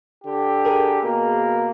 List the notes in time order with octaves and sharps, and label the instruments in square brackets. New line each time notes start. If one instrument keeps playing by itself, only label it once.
[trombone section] D3 G4
[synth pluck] G#4 A#4
[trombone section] B2 A#3